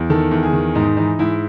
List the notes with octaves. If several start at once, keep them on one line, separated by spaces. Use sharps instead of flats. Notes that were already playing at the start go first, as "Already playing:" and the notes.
Already playing: E2
D#3 A4
E2
G#4
D#3
G#2 D#4
E3 D#4
G#2 E4